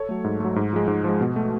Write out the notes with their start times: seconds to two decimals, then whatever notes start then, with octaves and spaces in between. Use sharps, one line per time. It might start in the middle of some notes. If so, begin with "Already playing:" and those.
Already playing: A4 C#5
0.09 F#3 A3
0.24 G#2
0.40 F#3 A3
0.56 G#2
0.73 F3 G#3
0.88 G#2
1.04 F3 G#3
1.21 B2
1.36 A3